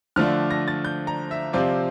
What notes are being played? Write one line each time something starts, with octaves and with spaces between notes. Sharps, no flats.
D3 F3 A3 D4 F4 F6
A#6
A6
G6
A#5
E5
C3 F3 C4 F4 D5